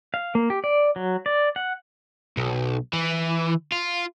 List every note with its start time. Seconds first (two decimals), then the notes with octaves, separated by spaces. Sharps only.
0.14 F5
0.35 A#3
0.50 G4
0.64 D5
0.96 F#3
1.26 D5
1.56 F#5
2.37 B1
2.93 E3
3.72 F4